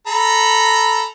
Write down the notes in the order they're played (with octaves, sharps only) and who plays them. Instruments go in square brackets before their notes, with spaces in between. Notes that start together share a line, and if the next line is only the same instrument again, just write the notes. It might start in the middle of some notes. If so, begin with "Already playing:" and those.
[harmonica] A4 A#5 B5